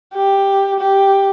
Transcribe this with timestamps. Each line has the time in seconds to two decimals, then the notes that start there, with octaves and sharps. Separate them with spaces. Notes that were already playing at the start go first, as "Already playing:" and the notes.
0.14 G4
0.79 G4